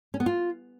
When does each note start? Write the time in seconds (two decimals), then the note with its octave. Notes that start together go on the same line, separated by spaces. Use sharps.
0.14 C#4
0.20 B3
0.26 F4